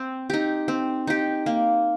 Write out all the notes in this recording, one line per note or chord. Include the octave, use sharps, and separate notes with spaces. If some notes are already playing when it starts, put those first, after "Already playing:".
Already playing: C4
D#4 G4
C4
D#4 G4
A#3